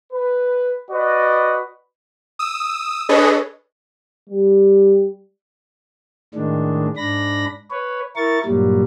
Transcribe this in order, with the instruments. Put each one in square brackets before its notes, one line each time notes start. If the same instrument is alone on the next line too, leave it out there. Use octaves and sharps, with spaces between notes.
[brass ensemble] B4
F#4 B4 D5 D#5
[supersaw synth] D#6 E6
D4 G#4 A4 B4 C#5 D#5
[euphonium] G3
[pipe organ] A2 D#3 G#3 D4
G#2 D4 B5 A#6
B4 C#5
E4 A#4 C#6 A6
G2 A#2 F#3 G3